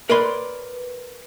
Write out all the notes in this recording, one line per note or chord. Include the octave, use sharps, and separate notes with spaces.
A#4 B4 C#5 D5 B5 C6